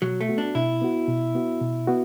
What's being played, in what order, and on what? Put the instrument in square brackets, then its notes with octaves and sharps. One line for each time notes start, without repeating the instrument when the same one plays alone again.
[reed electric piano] B2 [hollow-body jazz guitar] F#3
[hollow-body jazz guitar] A3
[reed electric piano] B3 F#4
[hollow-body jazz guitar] D4
[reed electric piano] B2 [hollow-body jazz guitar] E4
[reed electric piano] B3 F#4
B2
B3 F#4
B2
B3 F#4